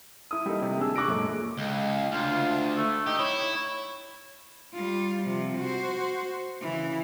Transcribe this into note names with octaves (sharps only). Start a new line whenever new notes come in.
E4 D#6
G3 A3 A#3 D#4
C3
D#1 D4 G#4 E6
C#6 D6 F#6 A#6 D7
F#2 A#2 G#3 A3
C#2
D2 F4
A3
D#4 G4
E4 C#5
G3 F4
C3 F3
F#4 C5
C#3 E3